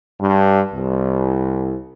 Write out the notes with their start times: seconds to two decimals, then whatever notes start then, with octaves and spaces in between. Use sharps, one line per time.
0.20 G2
0.73 C2